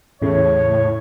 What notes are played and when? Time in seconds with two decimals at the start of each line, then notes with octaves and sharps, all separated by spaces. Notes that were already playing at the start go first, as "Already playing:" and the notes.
0.22 E2 A2 C#3 A3 C#5